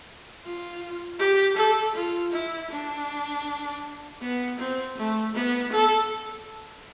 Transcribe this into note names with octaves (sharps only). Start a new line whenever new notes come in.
F4
G4
A4
F4
E4
D4
B3
C4
A3
B3
A4